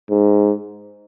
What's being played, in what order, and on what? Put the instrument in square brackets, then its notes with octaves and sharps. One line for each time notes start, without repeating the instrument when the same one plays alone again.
[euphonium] G#2